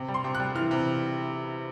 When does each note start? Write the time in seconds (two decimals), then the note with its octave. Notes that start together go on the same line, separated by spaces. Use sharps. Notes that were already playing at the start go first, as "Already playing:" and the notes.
Already playing: C3
0.08 G3
0.14 C6
0.24 C3
0.35 F#6
0.40 G3
0.55 E3 F6
0.71 C3